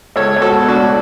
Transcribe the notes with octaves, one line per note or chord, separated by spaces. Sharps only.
C#2 A4 C#5
C#2
F#4 A4
B2
D4 F#4
A3